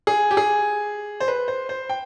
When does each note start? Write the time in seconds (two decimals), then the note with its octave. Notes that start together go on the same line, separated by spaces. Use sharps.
0.07 G#4
0.31 G4
0.37 G#4
1.20 C5
1.28 B4
1.48 C5
1.69 C5
1.90 G5